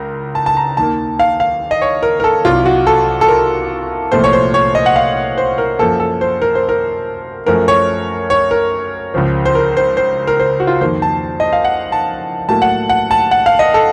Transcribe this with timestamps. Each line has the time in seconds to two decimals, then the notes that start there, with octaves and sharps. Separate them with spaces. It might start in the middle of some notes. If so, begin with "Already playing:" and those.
Already playing: C#2 A#4
0.35 A5
0.46 A5
0.57 A#5
0.77 D#2 D#3 A#3 A5
1.20 F5
1.40 F5
1.71 D#5
1.82 C#5
2.03 A#4
2.20 A#4
2.24 A4
2.45 C2 C3 F#3 F4
2.66 F#4
2.87 A4
3.21 A4
3.28 A#4
4.12 C2 A#2 F3 A3 C5
4.24 C#5
4.33 C5
4.54 C#5
4.75 D#5
4.86 F#5
4.96 F5
5.38 C5
5.58 A#4
5.79 F#2 F3 A#3 A4
6.00 A4
6.21 C5
6.42 A#4
6.55 C5
6.69 A#4
7.46 F#2 F3 A3 A#4
7.68 C#5
8.30 C#5
8.51 A#4
9.14 C#2 C#3 F3
9.45 C5
9.55 A#4
9.77 C5
9.97 C5
10.27 A#4
10.40 C5
10.60 F#4
10.67 F4
10.81 F2 D#3 A#3 C5
11.02 A5
11.40 D#5
11.53 F5
11.64 F#5
11.92 A5
12.49 A2 F#3 A#3 A5
12.62 F#5
12.89 F#5
13.11 A5
13.31 F#5
13.46 F5
13.59 D#5
13.74 A4